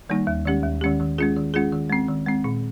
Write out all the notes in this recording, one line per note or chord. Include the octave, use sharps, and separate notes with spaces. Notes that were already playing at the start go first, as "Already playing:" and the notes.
D#3 G3 A#3 D#4
D#2
D#3 G#3 C#4 G4
D#2
D#3 G#3 C#4 G4
D#3
G#3 C#4 F4 G#4
D#3
G#3 C#4 F4 G#4
D#3
G#3 C4
D#3
G#3 C4
A#2